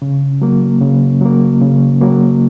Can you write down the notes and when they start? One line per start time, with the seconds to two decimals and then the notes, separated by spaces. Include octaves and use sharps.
0.02 C#3
0.42 F#3 A#3
0.82 C#3
1.21 F#3 A#3
1.62 C#3
2.01 F#3 A#3